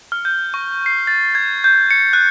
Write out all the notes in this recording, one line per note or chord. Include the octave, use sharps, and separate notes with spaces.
F6
G6
C#6
C7
A6
G#6
G6
C#7
F#6